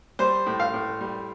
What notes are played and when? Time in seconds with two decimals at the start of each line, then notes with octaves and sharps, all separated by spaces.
0.19 G3 C5
0.46 A2
0.60 F5
0.74 A2
1.01 G3